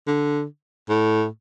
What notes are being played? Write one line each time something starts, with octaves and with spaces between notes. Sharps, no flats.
D3
A2